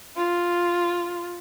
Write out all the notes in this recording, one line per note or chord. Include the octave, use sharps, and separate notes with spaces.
F4